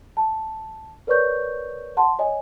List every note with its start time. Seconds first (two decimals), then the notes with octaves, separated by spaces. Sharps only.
0.17 A5
1.07 A#4 B4 C#5 D5 C#6 G6
1.97 F#5 A5 C6
2.19 C#5 D#5 G#5